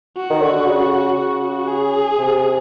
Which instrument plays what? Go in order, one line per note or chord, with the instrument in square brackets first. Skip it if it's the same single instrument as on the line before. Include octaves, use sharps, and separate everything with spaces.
[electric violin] F#4
[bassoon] D#3
D3
C#3
[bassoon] C#3 [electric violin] F#4
[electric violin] G#4
[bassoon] C3